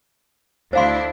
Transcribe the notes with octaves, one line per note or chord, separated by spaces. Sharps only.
D2 D4 E4 C5 F5 C6